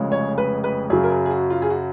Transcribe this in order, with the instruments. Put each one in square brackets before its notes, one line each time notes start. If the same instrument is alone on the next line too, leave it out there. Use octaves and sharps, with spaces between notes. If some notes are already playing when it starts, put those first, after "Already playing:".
Already playing: [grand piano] F1 F2 C#3 G#3
[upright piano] C#5
B4
B4
[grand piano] F#2 C#3 F#3 [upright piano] G#4
[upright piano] A#4
G#4
G#4
F#4
F4
G#4
F#4